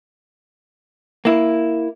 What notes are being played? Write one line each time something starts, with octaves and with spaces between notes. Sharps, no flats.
A#3 E4